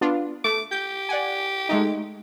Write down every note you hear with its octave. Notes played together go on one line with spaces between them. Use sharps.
B3 D4 F4
A3 D6
G4 G6
D5 F#5 G#5
G#3 A3 D#4